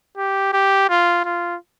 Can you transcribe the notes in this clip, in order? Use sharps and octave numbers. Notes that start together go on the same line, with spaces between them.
G4
G4
F4
F4